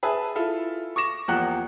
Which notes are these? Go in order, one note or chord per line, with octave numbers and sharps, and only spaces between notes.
G#4 B4 E5 G#5 A5
E4 F4 A4
C#6 D6 A#6 E7
E2 F3 A#3 G4 F#5 F#6